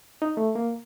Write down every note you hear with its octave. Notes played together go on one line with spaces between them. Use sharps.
D#4
A3
A#3